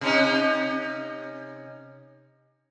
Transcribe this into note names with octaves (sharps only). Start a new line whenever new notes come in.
C3 C#4 D#4